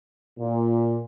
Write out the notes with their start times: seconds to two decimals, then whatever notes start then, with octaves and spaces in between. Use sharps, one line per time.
0.39 A#2